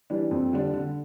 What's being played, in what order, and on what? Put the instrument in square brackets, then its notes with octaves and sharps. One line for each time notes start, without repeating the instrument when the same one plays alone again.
[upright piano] E3 G3 D4
F2
D3 G3 D4
D3